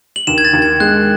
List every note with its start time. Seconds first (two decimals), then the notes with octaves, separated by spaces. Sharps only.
0.16 F#7
0.27 D#2 E7
0.38 G#6
0.45 A6
0.53 D#2
0.62 G#6
0.80 G#3 F#6